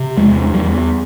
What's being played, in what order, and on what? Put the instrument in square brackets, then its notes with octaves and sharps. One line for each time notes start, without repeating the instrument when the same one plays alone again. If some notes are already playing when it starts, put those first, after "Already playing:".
Already playing: [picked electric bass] C3
E2 G#3
E2 G3